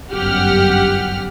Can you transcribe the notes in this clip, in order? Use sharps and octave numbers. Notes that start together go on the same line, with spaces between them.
G1 F#2 G4 F#5 F6